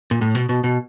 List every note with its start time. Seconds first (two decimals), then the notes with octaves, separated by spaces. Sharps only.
0.11 A#2
0.21 A2
0.35 B2
0.49 B2
0.64 B2